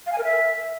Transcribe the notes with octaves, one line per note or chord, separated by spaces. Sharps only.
F5
G#5
A#4
E5